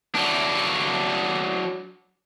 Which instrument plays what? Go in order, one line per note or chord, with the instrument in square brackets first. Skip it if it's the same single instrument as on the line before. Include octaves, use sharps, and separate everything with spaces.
[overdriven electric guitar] F#3 D4